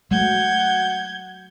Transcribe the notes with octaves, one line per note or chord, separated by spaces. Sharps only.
F#3 G#3 A3 F#5 G6 G#6